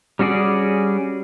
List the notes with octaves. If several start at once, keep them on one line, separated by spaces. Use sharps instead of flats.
G3 C#4 F#4 G#4 D5